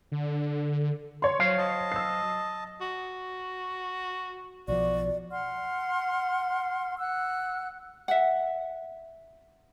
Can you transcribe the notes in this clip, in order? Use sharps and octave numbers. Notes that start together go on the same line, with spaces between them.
D3
C#5 C6
F#3 C5 F5
D#5 A5
E6 C7
F#4
B1 E3 F3 F#4 D5
F#5 C6 F6
F#5 E6 F#6
E5 F#5